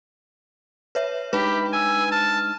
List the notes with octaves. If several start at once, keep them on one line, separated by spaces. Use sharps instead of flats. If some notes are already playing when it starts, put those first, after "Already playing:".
B4 C#5 E5
G#3 D4 D#4 G4 B4 B5
G#5 E6
A5 F6